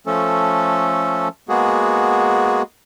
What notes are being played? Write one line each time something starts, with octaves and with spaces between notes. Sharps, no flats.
F3 A3 C#4 A4
G#3 A#3 B3 F#4 G#4